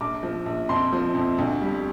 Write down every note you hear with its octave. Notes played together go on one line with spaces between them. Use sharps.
A#1 D6
F3
A#1
F2 C6
F3
F2
D2
G3